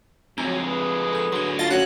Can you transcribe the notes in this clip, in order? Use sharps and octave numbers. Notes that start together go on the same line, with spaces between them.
F2 F#3 G#3 C4 A#5 G#6
G#4 B4
A4 G6
D3 F#3 C6 G#6
F4 D#5 A5 A6 A#6
A#3 C#4 F#4 F#6